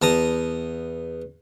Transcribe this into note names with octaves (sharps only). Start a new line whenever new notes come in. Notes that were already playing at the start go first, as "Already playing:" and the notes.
E2 A5 A#5 D#6